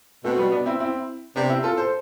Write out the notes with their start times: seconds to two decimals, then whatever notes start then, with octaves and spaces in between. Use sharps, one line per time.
0.24 B2 A3 C4
0.38 G3 B3
0.52 B3 D4
0.66 C4 E4
0.80 C4 E4
1.36 C3 B3 D4
1.49 C4 E4
1.63 F4 A4
1.77 A4 C5